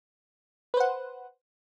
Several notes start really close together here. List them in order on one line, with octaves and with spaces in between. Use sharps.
B4 C5 F#5